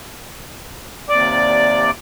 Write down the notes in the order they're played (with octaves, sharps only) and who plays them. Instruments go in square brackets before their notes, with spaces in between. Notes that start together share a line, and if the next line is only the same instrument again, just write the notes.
[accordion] D#2 C3 D5 D6